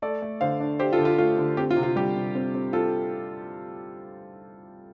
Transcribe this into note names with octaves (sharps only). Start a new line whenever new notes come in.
A3 A4 D5
A3
D3 C5 F5
D4
D4 G4 C5
F4 A4
D3
F4
A3 F4
D3
C4 G4
F4
C3
F4
G3 G4
C3
C4
C4
C4 F4 A4